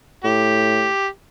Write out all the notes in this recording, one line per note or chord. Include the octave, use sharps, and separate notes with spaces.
A2 G4